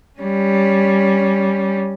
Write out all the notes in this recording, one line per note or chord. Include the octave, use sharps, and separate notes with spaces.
G3 C#4